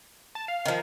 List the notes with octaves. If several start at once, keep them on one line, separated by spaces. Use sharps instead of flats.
A5
F5
D#3 F3